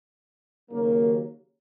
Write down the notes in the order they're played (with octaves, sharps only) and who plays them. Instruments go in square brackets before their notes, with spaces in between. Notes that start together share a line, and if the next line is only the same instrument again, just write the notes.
[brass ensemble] D#2 C#3 F#3 A#3